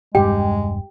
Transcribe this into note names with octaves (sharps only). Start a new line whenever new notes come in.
E1 G2 G3 G#3 G4 G5